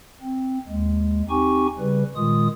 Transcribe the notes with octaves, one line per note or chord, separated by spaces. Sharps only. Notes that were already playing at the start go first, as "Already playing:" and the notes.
C4
D#2 G#3
C4 D#4 G4 G#5 C#6
C#3 G3 B4
A#2 D#3 G#3 F4 D#6